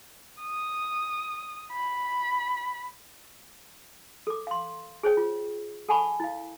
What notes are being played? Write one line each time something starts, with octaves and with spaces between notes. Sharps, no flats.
D#6
B5
A4 D6
F5 C6
G#4 C5 C#5 G5
F4
A4 F#5 G#5 A5 B5 C#6
E4 F5